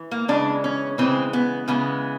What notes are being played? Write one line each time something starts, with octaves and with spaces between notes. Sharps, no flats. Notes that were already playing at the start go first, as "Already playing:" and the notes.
Already playing: E3
A#3
C#3 E3 G#3 D4
C#4
C#3 E3 G#3 C4
B3
C#3 E3 G#3 B3